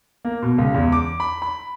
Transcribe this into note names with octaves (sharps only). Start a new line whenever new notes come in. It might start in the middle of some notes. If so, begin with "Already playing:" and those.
A#3
B2
C#2
E2
D6
B5
B5